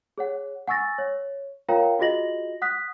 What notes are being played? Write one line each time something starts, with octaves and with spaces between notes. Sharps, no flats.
G#4 C#5 F#5
F#5 G#5 C#6 E6 A6 A#6
C#5
F4 A#4 C#5 F5 G5 A#5
F4 F#4 G#4 D#5 A#6 F#7
F#5 D#6 F#6 B6